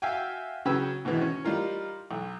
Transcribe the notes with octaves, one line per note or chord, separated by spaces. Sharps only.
F#4 E5 F5 G5 G#5
C#3 F#3 C#4 B4 G5 E6
G#2 B2 D#3 E3
C#4
G3 D#4 F4 A#4
B1